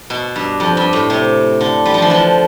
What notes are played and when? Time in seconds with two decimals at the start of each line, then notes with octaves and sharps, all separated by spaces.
0.10 B2
0.36 G2
0.60 F2
0.77 G2
0.93 A2
1.10 C3
1.61 D3
1.86 G3
1.94 F3
2.02 E3
2.10 D3 F3